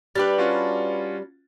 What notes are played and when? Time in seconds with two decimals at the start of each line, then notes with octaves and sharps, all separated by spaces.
0.15 G3 D4 G4 B4 A6
0.38 C#4 F4 F#4